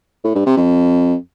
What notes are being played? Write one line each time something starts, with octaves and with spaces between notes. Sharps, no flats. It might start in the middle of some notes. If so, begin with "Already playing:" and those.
A2
G2
C3
F2